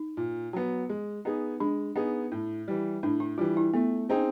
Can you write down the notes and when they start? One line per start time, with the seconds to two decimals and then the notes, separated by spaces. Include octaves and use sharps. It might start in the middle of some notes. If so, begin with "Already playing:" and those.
Already playing: D#4
0.17 A#2
0.53 F#3 B3
0.89 G#3
1.25 B3 D#4 G#4
1.60 G#3 D4
1.96 B3 D#4 G#4
2.32 A2
2.68 E3 G3
3.03 A2 D4
3.20 E4
3.38 E3 G3 F4
3.57 E4
3.74 A3 B3
4.09 C4 C#4 D#4 G#4